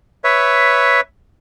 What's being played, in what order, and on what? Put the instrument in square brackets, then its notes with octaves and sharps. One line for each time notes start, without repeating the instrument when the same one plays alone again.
[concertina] B4 C#5 E5